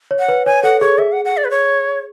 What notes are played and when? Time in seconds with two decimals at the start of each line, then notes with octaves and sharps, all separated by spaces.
0.11 C#5
0.19 F#5
0.29 B4
0.46 C#5 G#5
0.63 A4 F#5
0.81 G#4 C#5
0.98 G#4 E5
1.12 F#5
1.25 F#5
1.37 D5
1.45 B4
1.51 C#5